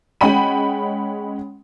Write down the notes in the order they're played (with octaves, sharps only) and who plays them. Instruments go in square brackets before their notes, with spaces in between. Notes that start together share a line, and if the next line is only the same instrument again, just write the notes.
[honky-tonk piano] G#3 C#4 F#5 G5 B5 D#7